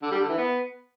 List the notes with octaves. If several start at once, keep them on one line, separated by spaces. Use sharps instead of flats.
D3
G3
D3
E3
B3